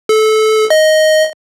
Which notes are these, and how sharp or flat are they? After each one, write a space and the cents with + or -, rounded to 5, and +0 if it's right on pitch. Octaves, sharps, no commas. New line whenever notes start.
A4 -20
D#5 +5